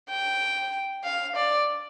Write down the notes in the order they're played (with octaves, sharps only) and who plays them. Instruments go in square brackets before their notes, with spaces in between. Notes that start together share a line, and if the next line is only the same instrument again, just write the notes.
[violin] G5
F5
D5